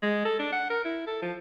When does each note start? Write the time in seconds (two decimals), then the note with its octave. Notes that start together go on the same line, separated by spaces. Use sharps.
0.03 G#3
0.25 A4
0.39 D4
0.52 F#5
0.70 A#4
0.85 E4
1.07 A4
1.22 F3